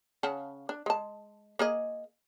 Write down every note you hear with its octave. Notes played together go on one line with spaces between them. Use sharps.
C#3 F#5 A5
D4
G#3 A5
A#3 G#4 D#5